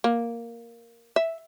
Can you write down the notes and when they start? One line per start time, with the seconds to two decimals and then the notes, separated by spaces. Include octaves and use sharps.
0.04 A#3
1.16 E5